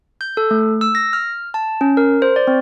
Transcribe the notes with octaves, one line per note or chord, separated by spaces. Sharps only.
G6
A4
A3
E6
A#6
F6
A5
C#4
A#4
C5
D5
C4